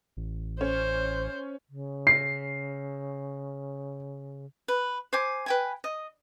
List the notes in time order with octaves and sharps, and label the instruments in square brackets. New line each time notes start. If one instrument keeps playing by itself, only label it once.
[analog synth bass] A1
[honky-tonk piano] C#4 [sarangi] C5
[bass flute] C#3
[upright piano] C7
[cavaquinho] B4
C5 G#5 D6
B4 G5 G#5
D#5